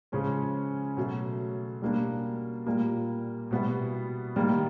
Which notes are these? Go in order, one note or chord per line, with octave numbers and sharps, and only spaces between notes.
C#3 F3 G#3 C#4
B2 F#3 A3
B2 G3 A#3 D4
A#2 G3 A#3
B2 G3 B3 E4
D#3 G3 A#3